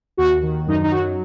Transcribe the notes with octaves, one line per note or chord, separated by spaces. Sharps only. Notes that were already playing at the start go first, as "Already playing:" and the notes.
D#2 F#4
D#3
F#2 D#4
D#4
F#3 F#4